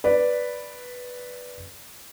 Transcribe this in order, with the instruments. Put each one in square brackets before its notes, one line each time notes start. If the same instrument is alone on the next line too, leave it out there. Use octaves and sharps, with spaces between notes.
[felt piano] B4 D5